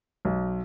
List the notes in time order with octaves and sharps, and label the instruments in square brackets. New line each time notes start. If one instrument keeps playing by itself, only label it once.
[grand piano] B1